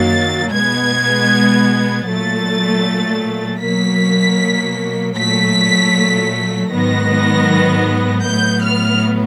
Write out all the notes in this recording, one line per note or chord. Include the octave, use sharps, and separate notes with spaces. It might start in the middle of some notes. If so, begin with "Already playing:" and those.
Already playing: F#2 D#3 F#3 A#3 A6
B2 G#3 B3 G#6
A#2 F#3 A3 A6
B2 F#3 A#3 B6
A#2 F#3 A3 B6
G#2 D#3 F#3 B3 A#6
A2 F#3 B3 G6
F6